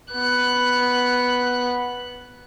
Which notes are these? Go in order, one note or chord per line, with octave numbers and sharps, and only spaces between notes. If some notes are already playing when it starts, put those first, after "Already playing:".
B3 F#6